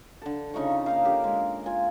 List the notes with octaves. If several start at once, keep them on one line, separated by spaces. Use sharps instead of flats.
D3 A4
C#3 D#4 F4 C#6
A#3 D#4 F5
D3 G4 A#4
G#3
F4 G#5